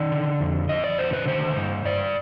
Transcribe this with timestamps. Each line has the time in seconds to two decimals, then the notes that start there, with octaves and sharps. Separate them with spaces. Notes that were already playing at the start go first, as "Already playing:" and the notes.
Already playing: D#3 D5
0.12 D3
0.41 F2
0.69 F2 D#5
0.84 D5
0.98 D3 C5
1.13 B4
1.27 D#3 C5
1.56 G2
1.85 G2 D5